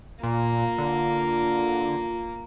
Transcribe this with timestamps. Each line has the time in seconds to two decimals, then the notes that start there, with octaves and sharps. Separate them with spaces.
0.23 A#2 A#3 F4
0.78 D3